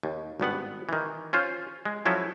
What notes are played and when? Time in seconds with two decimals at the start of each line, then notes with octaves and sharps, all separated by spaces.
0.03 D#2
0.40 G#1 G2 B3 F#5
0.89 D#3 E3
1.33 C#4 F4 C5
1.85 G#3
2.05 F3 F#3 C#4 E4 A4